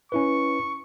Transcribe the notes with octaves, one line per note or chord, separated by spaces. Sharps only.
C#4 E4 B4 C#6